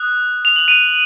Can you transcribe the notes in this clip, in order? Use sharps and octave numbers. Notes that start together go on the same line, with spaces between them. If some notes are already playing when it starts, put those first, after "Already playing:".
Already playing: D#6 F#6
F7
F#7
D#7 F7